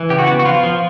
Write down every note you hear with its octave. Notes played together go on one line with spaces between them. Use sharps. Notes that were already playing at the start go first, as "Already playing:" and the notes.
Already playing: E3
C#3 G4
F#4
B3
F#4
F3 F4
F3